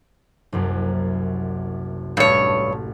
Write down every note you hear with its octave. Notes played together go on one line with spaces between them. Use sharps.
F#1 C2 F#2
A1 G2 C#5 A5